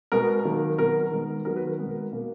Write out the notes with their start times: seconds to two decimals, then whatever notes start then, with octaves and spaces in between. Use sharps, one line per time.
0.12 B2 G#3 B3 A#4
0.45 D#3 F#3 A#3
0.78 B2 F#3 B3 A#4
1.12 D#3 G#3 B3
1.45 D#3 F#3 B3 A#4
1.56 B4
1.67 A#4
1.79 B2 G#3 B3
2.11 B2 A#3